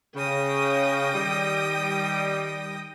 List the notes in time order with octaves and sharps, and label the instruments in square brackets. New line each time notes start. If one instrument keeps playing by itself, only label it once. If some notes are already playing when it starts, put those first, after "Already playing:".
[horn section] C#3 [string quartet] G5 D#6 A#6
[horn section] D#3 G3